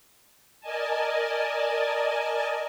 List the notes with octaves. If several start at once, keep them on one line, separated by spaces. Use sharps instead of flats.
A#4 D5 D#5 G#5 A5